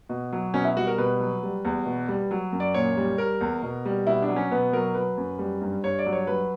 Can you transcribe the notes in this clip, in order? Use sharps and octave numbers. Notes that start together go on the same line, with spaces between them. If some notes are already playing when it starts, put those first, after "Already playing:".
B2
F#3
B2 C#4
E4
G3 F#4
A#4
B2 B4
F#3
G3
E2
B2
G3
F#3
F#2
D5
A#2 C#5
G3
G3 A#4
E2
B2
G3
B2 E4
D4
F#3
C#4
B2 B3
F#3 A#4
F#3 B4
F#2
G3
G2
G2 C#5
D5
F#3
C#5
F#3 B4